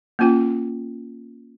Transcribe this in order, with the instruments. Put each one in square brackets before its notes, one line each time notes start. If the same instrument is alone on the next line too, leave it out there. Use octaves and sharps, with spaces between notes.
[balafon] A#3 C#4 F4 G5